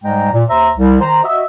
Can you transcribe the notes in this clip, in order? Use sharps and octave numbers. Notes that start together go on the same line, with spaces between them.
G#2 G3 G#3 G5 A#5
A#2
D#2 C5 E5 A#5
C2
D#3 C5 A#5
F#4 D#5 E5